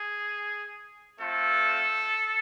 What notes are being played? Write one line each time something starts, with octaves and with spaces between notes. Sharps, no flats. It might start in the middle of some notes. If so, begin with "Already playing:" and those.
Already playing: G#4
A3 C4 F4 A4